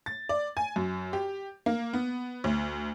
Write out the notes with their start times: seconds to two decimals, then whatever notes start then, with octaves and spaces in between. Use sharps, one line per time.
0.06 A6
0.29 D5
0.57 G#5
0.76 F#2
1.13 G4
1.66 A#3
1.93 B3
2.44 D2